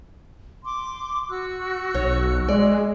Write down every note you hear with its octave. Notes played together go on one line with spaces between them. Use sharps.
C6 D6
F#4 E6 F#6
B1 C#5
G#3 D5